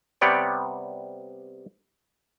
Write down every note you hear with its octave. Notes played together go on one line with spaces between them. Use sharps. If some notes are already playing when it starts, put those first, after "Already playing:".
C3 G3 B3 C#5 D5 G5